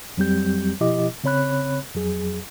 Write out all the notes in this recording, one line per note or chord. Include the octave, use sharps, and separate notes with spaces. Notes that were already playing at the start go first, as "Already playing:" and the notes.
F2 F#3 G3 C4 G4 G6
B2 F3 E4 G4 D#5 D6
C#3 C4 C#5 B5 F#6
F2 F#3 G#4